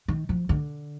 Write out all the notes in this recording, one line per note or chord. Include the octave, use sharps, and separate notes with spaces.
D#3
F3
D3